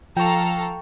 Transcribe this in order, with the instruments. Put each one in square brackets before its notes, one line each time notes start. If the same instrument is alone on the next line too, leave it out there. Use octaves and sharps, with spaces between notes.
[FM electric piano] F3 [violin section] A4 F5 A#5 [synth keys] G5 C#6